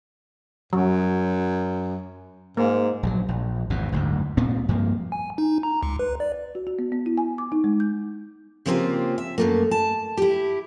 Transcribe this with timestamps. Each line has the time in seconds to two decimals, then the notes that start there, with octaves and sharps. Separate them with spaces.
0.73 F#2 F#3
2.57 G#2 A#3
3.03 A#1 F3 F#3
3.28 A#1
3.70 G#1 E2 B2
3.92 F#1 D2 G#2
4.37 C2 A#2 B3 C4
4.68 G2 F3 A#3
5.12 G#5
5.38 D#4
5.63 A#5
5.83 C#2
5.99 B4
6.20 D5
6.55 F#4
6.67 F#4
6.79 B3
6.92 B3
7.06 E4
7.18 G#5
7.38 D6
7.52 D#4
7.64 G#3
7.80 G6
8.66 C#3 F3 A#3 C4 F4 G4
9.18 E5
9.38 F#2 A3 A#3
9.71 A5
10.17 E4 G4